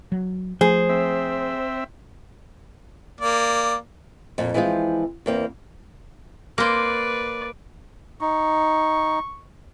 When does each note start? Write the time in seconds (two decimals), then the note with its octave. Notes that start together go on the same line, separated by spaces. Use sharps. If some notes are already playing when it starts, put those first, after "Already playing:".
0.12 F#3
0.61 F3 A3 G#4 C5
0.89 C4 E5
3.21 A#3 D5
4.38 F2 A#2
4.54 E3 F3 G#3 C4 F4
5.26 E2 A#3 C4
6.58 A#3 B4 C5 D5
8.21 D#4 C#6